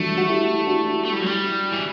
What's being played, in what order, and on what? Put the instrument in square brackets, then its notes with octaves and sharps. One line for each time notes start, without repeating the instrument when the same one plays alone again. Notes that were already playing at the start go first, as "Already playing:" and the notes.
Already playing: [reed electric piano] E3 G3 D4 F#4 [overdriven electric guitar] A3
[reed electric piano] F#4
E4 G4
E4
D4 F#4
[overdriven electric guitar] A3
G3
F#3
G3
E3